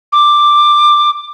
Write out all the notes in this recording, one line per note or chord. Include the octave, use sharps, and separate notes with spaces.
D6